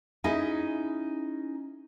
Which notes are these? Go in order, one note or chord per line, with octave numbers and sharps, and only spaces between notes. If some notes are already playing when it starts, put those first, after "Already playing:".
C#4 D#4 E4 G#4 D#5